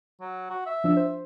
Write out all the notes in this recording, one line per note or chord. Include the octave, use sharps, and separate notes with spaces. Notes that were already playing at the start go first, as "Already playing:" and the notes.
F#3
F#4
E5
F3 D4 E6
C5